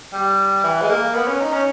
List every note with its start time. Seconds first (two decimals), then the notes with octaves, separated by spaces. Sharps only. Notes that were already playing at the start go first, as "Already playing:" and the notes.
0.13 G3
0.64 E3
0.82 G#3
0.90 A#3
1.15 B3
1.27 C#4
1.40 D#4
1.53 C#4